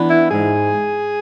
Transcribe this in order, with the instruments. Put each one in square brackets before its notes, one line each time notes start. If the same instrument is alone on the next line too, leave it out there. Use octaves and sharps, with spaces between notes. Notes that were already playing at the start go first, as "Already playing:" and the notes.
Already playing: [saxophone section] E3 B3 D4
E4
G#2 G#4